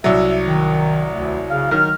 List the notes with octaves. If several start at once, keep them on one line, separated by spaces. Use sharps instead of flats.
C2 F#3 E5
D#3
D2
C#3 F5
D#3 F#3 F6